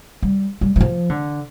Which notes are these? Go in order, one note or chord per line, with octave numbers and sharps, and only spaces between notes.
G3
G3
E3
F3
D3